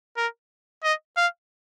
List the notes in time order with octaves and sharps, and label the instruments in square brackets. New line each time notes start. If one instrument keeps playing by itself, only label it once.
[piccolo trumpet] A#4
D#5
F5